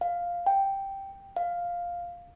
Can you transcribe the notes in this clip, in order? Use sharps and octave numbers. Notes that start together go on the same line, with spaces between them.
F5
G5
F5